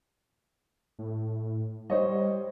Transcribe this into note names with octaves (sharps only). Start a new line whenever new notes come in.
A2
G3 C5 C#5 D#5